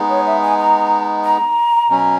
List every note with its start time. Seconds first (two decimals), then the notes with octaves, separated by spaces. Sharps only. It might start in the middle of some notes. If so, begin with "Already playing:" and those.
Already playing: G#3 B3 D#4
0.09 C#5
0.26 E5
0.43 G#5
0.58 A#5
1.24 A#5
1.89 B2 F#3 C#4